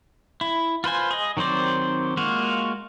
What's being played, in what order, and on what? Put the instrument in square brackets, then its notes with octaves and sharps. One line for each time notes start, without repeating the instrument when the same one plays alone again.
[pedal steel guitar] E4
F4 B4 C5 G#5
G#4 D#5
D#3 F#3 C4 C5 D5
G#3 A#3 F4 F#4